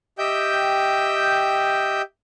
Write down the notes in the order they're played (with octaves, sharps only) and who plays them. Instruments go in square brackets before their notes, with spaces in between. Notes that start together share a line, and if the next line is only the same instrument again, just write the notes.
[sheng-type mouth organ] G4 D#5 E5 G5 G6